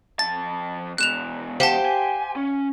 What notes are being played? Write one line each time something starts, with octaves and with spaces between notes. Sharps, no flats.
F2 A5 A6
E2 B2 F#6 E7 F7
G4 C5 F5 F#5 A5
G#5
C#4